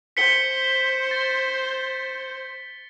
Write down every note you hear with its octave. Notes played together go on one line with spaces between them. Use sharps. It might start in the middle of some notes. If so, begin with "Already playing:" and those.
C5 B6 C#7 G7
A6